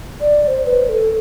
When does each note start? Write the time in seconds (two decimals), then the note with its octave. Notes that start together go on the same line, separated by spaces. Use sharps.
0.21 D5
0.43 D5
0.48 C5
0.66 B4
0.89 A4